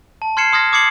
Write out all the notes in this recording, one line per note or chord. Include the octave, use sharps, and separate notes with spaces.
A5
C6 F6 G#6 C7 C#7 E7
C6 D#6 F6 G#6 A#6
D6 D#6 G#6 C7 C#7 F#7